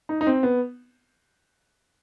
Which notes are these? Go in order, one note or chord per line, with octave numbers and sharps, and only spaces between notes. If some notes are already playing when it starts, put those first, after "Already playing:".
D#4
D#4
C4
B3